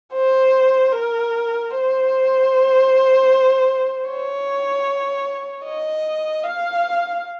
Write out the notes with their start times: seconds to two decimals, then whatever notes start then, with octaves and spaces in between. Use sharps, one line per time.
0.13 C5
0.92 A#4
1.71 C5
4.08 C#5
5.65 D#5
6.44 F5